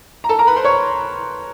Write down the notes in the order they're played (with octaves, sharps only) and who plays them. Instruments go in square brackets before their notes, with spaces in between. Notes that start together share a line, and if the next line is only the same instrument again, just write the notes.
[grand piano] A#5
A4 A5
A#4 A#5
B4 B5
C5 C6
C#5 C#6